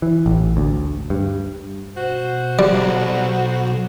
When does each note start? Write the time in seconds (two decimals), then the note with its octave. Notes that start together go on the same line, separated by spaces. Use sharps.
0.02 E3
0.26 A1
0.57 D2
1.10 G2
1.96 B2 F#4 C5
2.59 B1 G3